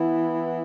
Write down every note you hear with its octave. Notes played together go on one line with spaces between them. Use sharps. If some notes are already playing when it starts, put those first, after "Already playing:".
Already playing: E3 B3 E4